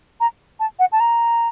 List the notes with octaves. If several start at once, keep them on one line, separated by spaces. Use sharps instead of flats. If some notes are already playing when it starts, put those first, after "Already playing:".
A#5
A5
F#5
A5
A#5